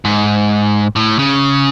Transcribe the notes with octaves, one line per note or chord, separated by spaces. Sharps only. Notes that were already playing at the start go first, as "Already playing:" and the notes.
G#2
A2
C#3